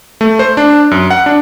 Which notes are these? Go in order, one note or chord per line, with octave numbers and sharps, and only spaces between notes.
A3
C5
D4
F#2
F#5
D4